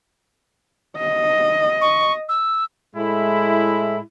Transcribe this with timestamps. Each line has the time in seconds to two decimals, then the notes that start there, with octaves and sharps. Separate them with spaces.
0.97 D#5
1.81 C#6
2.29 E6
2.96 A2 G#3 E4